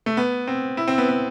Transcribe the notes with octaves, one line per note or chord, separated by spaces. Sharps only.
A3
B3
C4
E4
C4
B3
B3